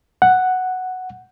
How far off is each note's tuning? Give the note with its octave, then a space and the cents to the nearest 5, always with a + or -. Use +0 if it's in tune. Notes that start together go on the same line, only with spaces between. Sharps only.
F#5 +0